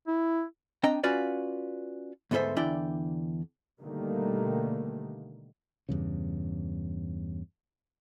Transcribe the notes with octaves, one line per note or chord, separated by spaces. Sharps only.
E4
C4 D4 D#5 G5 A#5
C#4 F4 F#4 B4 D5 F5
D2 G#2 B3 A4 C5 E5
E2 D3 D4 E4 D5 G5
B2 D3 D#3 G3 A3 A#3
E2 G2 C#3